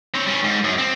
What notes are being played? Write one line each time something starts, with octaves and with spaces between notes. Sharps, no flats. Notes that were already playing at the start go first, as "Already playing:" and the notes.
C4 C#5
G3 C#4
G#2
F#2
C4